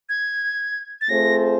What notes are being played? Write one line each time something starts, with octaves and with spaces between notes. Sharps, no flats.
G#6
A6
A3 C4 F4 G#4 C5 A#6